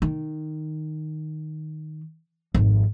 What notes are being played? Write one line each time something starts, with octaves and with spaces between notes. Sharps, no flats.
D#3
G#1 F2